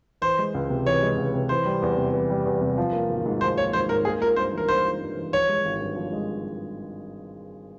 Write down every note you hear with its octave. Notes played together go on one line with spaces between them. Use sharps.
E3 C5
G#3
C#2
C3
E3 C#5
G#3
C#2
C3
E3 C5
G3
E2
C3
E3
G3
E2
C3
F3
A#3
G#1
G#2
F3 C5
A#3 C#5
G#1 C5
G#2 A#4
A#3 G#4
F4 A#4
G2 C5
E3 A#4
A#3 C5
F4
G2
E3
F3 C#5
G#3
G#1
G2
F3
G#3